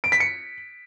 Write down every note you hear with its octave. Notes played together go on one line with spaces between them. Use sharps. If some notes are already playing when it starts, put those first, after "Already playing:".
D7
B6
C#7